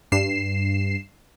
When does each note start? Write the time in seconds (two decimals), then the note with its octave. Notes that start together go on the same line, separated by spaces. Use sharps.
0.12 G2 C7 E7